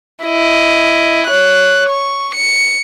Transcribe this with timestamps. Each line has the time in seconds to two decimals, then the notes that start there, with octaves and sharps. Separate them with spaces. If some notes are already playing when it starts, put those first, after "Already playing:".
0.24 E4 D#5
1.26 C#5 F#6
1.89 C#6
2.35 C#7